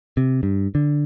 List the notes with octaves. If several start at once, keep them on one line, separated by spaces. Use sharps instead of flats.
C3
G2
D3